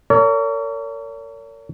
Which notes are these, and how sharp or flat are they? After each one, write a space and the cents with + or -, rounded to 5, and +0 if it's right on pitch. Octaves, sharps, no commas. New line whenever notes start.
A#4 -35 C#5 +40